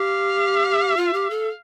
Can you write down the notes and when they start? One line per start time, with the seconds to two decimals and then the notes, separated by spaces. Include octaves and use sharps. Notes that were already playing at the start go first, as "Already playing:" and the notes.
Already playing: G4 F5
0.97 F4
1.13 G4
1.30 A4